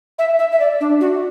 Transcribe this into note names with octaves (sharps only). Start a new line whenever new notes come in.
E5
E5
E5
D5
D4
F#4